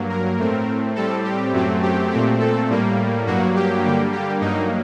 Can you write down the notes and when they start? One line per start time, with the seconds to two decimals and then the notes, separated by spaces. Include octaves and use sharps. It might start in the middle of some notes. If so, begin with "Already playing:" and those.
Already playing: G2 F#3 A#3
0.09 A#4
0.38 A2 A3 C4
0.95 A2 G3 C4 A4
1.24 G4
1.53 F#2 F#3 A3 C4
1.83 G4
2.11 A#2 A3 C4
2.40 A4
2.69 A2 G3 A#3
3.27 G2 F#3 A#3 F#4
3.56 G4
3.84 D3 G3 A#3
4.13 G4
4.41 G2 F#3 A#3 D#4